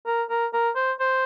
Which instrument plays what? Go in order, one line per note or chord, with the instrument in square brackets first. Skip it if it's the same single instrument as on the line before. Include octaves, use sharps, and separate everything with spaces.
[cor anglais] A#4
A#4
A#4
C5
C5